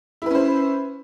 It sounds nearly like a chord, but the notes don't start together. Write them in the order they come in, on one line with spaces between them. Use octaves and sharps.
E4 B4 C#4 C5